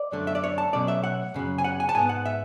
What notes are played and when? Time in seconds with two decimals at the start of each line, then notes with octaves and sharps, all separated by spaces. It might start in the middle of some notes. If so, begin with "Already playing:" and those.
Already playing: D5
0.12 F#2 D3 A3
0.27 E5
0.35 D5
0.44 C#5
0.58 A5
0.73 B2 F#3 A3 C#4 D5
0.88 E5
1.04 F#5
1.34 F#2 C#3 F#3
1.58 G#5
1.64 F#5
1.80 G#5
1.89 A5
1.95 G#2 G#3 B3 G#5
2.09 F#5
2.26 E5